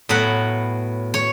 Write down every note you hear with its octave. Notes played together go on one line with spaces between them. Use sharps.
A2 F#3 B3 F#5
C#5